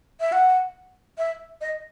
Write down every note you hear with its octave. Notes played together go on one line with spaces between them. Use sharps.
E5
F#5
E5
D#5